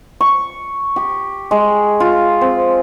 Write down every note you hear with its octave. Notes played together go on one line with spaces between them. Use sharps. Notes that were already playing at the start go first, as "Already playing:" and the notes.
C#6
G4
G#3
F4
C4